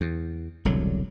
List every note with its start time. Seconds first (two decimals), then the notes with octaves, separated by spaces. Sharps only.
0.01 E2
0.65 E1 C2 D3 F#3